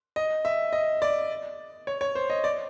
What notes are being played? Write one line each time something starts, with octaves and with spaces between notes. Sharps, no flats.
D#5
E5
D#5
D5
C#5
C#5
C5
D#5
D5